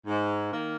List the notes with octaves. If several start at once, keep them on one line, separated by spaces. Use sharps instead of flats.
G#2
D#3 A#3